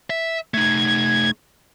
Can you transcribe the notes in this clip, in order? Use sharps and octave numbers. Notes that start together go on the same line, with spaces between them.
E5
A3 D#4 G#6